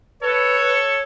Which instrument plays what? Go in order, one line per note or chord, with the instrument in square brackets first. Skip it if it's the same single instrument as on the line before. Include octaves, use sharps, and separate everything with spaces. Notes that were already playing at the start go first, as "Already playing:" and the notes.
[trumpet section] A4 C#5 [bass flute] B4